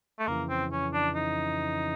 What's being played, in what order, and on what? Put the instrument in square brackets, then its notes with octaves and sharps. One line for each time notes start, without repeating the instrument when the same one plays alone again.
[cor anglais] A3
[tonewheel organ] F2 C#3 E3 [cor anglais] A#3
[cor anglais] C4
C#4
D4
D#4